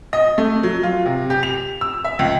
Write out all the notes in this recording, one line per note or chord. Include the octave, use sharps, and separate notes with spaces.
D#5
A3
F#3
F4
C3
G4
F7
E6
E5
C#2